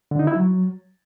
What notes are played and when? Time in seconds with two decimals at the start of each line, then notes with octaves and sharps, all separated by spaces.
0.11 D3
0.19 D#4
0.27 E4
0.35 F#3